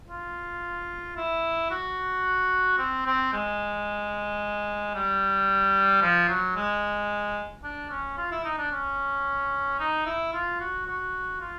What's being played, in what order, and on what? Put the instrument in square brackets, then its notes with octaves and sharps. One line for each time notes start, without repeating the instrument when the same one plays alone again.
[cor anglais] F4
E4
F#4
C4
C4
G#3
G3
F3
F#3
G#3
D4
C#4
F4
E4
D#4
D4
C#4
D#4
E4
F4
F#4
F#4
F4